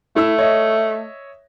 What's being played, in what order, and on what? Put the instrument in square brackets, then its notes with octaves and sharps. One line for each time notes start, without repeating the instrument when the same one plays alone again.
[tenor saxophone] A3 [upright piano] E4 E6
[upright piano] C#5 D#5 E5